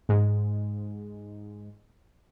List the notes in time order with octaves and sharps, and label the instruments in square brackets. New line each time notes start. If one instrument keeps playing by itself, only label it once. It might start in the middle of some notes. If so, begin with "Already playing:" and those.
[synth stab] G#2 G#3